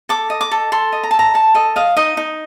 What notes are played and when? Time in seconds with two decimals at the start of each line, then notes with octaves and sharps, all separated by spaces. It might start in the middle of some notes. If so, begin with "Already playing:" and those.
0.09 A4 D6
0.30 D#5
0.41 D6
0.51 A4
0.72 A4 C6
0.92 D#5
1.03 A#5
1.11 A5
1.14 A4
1.19 A#5
1.34 A4 A5
1.55 A4 D#5
1.76 D#5 F5
1.97 D#4 D#5
2.17 D#4